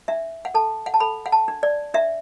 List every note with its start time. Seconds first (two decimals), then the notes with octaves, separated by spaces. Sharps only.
0.08 D4 E5
0.45 F#5
0.54 A4 A5
0.86 F#5
0.94 A5
1.00 A4 B5
1.26 F#5
1.32 A5
1.48 D4
1.63 D5
1.94 D4 E5